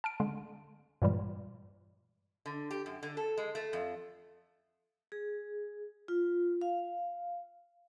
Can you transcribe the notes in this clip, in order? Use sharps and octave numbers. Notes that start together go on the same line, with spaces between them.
A5 F6 D7
D3 G#3
G2 A#2 E3 G3 G#3
D3
G4
F#2
D3
A4
G#3
A3
F2
G#4
F4
F5